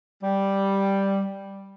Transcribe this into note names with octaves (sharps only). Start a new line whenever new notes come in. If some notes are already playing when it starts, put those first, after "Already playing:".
G3